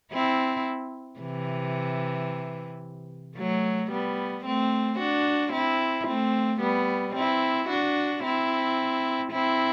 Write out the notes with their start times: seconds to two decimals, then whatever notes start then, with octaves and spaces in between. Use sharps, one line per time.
0.12 C4 E4
1.20 C3 E3
3.37 F#3 A3
3.91 G3 B3
4.45 A3 C4
4.99 D4 F#4
5.52 C4 E4
6.07 A3 C4
6.61 G3 B3
7.15 C4 E4
7.69 D4 F#4
8.23 C4 E4
9.31 C4 E4